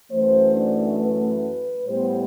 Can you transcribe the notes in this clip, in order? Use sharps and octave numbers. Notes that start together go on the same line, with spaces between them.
F#2 E3 A3 C5
D4
B4
A2 G3 B3 C5